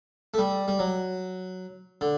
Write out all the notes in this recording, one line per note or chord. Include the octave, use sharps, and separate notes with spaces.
A3
G3
G3
F#3
D3